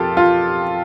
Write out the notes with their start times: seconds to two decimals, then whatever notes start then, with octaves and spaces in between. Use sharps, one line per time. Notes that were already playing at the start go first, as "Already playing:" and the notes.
Already playing: F2 A#3 F4 G4 A4
0.17 F4